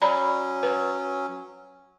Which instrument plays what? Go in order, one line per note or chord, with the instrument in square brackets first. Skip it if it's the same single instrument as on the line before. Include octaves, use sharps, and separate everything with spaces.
[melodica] F#3 C#4 [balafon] D5 A#5 B5
[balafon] B4